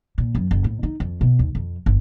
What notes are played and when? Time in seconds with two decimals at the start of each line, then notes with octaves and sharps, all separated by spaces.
0.18 A#2
0.35 F#2
0.51 F#1
0.64 A2
0.83 D#4
1.00 F2
1.21 B2
1.39 D#2
1.55 F2
1.86 G1